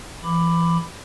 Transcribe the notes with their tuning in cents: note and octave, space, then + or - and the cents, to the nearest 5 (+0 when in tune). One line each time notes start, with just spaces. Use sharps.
E3 +35 B5 +10 D6 +5